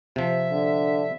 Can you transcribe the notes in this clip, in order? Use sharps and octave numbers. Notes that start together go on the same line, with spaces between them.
C3 F3 E5
D3